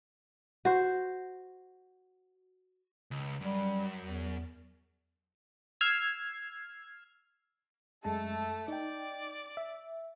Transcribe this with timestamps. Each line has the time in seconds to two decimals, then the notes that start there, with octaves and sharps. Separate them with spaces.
0.65 F#4 C5
3.11 C#2
3.41 F#2 G3
4.01 E2
5.81 E6 F6 G#6 C7
8.04 F#2 G#3 A3 A4 A5
8.68 D#4 D5 G5
9.57 E5